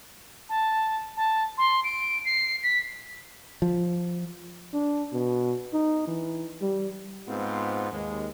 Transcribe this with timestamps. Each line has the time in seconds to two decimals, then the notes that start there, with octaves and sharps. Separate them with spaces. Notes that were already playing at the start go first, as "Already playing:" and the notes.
0.49 A5
1.16 A5
1.58 C6
1.84 D7
2.25 C7
2.63 B6
3.62 F3
4.73 D4
5.13 B2
5.73 D#4
6.07 E3
6.61 G3
7.28 G#2 B3 C4 F4
7.91 D#2 G#3